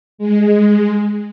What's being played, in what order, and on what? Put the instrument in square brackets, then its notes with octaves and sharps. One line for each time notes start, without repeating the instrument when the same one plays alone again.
[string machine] G#3